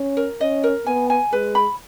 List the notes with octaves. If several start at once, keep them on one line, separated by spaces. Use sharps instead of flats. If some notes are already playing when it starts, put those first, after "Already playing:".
Already playing: C#4
A#4
C#4 D#5
A#4
B3 G#5
G#5
G#3 B4
B5